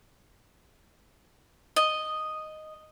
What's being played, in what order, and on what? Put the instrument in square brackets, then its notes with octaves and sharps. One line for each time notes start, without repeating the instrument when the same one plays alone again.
[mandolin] D#5